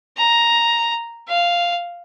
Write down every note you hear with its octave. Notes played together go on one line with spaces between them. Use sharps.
A#5
F5